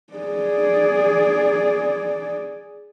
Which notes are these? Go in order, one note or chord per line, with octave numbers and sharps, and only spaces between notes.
G#4 D5